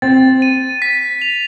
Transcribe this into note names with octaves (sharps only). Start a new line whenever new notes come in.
C4 A6
D#7
B6
F7